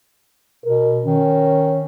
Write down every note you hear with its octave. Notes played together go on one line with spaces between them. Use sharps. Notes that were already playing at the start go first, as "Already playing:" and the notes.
B2 A#4
D#3 C#4